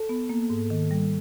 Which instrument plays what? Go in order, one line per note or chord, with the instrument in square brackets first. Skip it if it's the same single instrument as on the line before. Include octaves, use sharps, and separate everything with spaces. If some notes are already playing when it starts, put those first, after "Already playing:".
Already playing: [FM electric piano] A4
[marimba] B3
A#3
G#2
D#3
G3